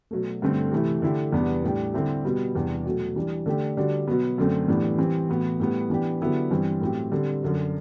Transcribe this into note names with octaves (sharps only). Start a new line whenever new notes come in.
B2 F#3 A3
G2 D3 A3 C4
C3 E3 A3 E4
D3 A3 E4 G4
E2 C3 G3 B3 D4
A2 G3 D4 G4
D3 G3 C4 E4 G4
B2 G3 B3
E2 C3 G3 D4
B2 F#3 A3
E3 G3 D4
D3 A3 D4 G4
D3 G3 D4 F#4
B2 F#3 B3
F#2 D3 A3 C4
A2 E3 G3 B3 D4
E3 G3 C4
A2 E3 B3 F#4
A2 G3 B3
E3 B3 D4 G4
D3 F#3 B3 E4 G4
G2 E3 G3 C4
A2 F#3 C4 E4 G4
D3 G3 C4
F#2 D3 F#3